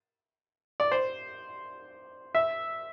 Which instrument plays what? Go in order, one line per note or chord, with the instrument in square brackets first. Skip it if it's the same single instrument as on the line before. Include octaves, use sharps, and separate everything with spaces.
[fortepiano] D5
C5
E5